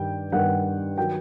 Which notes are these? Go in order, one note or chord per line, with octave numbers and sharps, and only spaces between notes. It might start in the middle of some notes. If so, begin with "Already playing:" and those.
Already playing: G2 D#3 G3 G5
G2 D#3 G3 F#5
D#3 F#3 G5